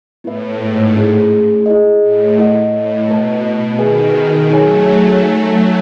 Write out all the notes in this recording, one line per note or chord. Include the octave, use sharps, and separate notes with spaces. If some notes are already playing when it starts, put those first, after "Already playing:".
A2 B3 E4 B4 E5
G#2
A3 C#4 E4 G#4
E4 G#4 D#5
A2
A3 E4 A4 D#5 F#5
A2
B2 A3 E4 B4 D#5 A5
B2 D#3 G#4 B4 E5 G#5
F#3 A3 D#4 G#4 C#5 G#5
D#4 A4 E5 G#5